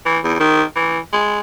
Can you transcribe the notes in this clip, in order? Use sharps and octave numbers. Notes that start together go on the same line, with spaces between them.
E3
E2
D#3
E3
G#3